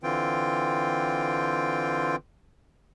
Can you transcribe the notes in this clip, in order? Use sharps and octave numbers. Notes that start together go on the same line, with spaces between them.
D3 E3 C4 F4 G5